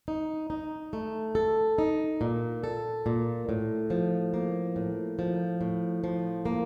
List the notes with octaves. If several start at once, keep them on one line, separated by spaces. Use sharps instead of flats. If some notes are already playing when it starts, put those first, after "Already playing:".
D#4
D#4
A3
A4
D#4
A#2
A4
A#2
A2
F3
A#3
A2
F3
A2
F3
A#3